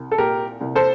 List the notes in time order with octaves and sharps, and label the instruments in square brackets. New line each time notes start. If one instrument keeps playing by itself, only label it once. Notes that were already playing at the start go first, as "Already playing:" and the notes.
Already playing: [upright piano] C2
A4
A#2 G4 A#4
C2
A4 C5